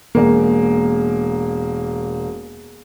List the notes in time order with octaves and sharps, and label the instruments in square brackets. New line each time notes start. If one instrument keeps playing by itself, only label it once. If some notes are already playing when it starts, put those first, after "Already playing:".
[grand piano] E1 A#3